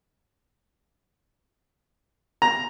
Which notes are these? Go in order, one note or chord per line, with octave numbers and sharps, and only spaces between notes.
A#5